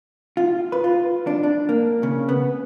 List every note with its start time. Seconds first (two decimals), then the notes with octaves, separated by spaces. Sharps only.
0.37 F4
0.72 B4
0.84 F4
1.27 D4
1.43 D4
1.69 A#3
2.03 C#3
2.29 B3